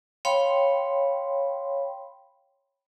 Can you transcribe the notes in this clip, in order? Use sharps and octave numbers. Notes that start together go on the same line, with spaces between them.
C#5 F5 G5 B5 C6